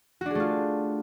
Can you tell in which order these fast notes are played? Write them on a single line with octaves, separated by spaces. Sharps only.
F#4 D4 G#4 A3 F4